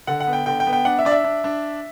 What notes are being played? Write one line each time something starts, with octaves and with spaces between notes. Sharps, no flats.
D3 F#5
F#5
B3
G5
D3 G5
G5
B3
G5
D4 F#5
E5
D4 D5
E5
D4
D4